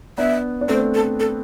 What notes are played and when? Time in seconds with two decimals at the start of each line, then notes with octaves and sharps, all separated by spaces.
0.18 B3 D4 E5
0.61 D4
0.68 A3 C4 C5
0.94 A4
1.20 A4